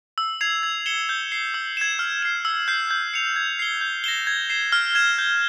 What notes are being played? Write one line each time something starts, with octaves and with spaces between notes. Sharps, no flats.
E6
G#6 C7 F7
G#6
C#7 E7 G7
G6
C7 G7
E6
G#6 E7
F6
C7 E7
E6
G6 C7
G6
C#7 F7
G#6
C7 G7
G6
A#6 E7 G7
G#6
C7 E7
F6
G#6 E7 G7
G6